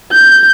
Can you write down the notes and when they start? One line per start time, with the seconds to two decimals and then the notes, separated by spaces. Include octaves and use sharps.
0.12 G6